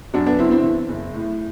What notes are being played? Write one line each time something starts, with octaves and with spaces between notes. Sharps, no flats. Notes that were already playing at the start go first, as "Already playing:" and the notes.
F#2 D4 F#4
B3 D4
F#1 C4 E4
C4 E4
E3
F#1
A2